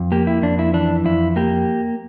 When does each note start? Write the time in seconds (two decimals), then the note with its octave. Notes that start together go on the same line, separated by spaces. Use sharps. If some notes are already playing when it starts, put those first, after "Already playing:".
Already playing: F2
0.12 A#3 G4
0.27 E4
0.42 F2 D4
0.59 E4
0.74 E3 D4
1.05 F2 E4
1.36 A#3 G4